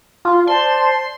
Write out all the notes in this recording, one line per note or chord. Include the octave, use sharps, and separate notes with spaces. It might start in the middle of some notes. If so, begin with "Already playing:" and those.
F4
C5 D5 A5 C6